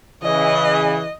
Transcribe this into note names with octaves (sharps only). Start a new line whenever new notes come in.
C#3 E3 D#5